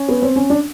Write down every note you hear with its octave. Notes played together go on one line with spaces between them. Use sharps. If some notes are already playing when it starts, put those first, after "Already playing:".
Already playing: C#4
B3
C4
C#4
D4